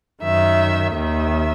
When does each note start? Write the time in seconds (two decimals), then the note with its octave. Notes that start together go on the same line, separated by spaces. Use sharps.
0.23 F#2 D#3 E5
0.93 D#2 D#3 E5